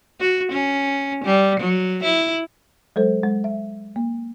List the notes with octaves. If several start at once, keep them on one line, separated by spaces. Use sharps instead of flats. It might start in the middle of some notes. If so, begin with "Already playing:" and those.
F#4
C#4
G3
F#3
E4
F#3 G#3 A4 C5
G#3
E5
A#3